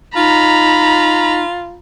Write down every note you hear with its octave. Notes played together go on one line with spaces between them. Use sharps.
D#4 F4 A#5 B5